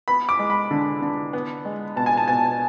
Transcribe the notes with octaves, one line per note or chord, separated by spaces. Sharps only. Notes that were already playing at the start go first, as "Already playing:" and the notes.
B3 B5
D6
G#3
B5
D3
D3
B3
G#3
B2 A5
G#5
A5
B2 G#5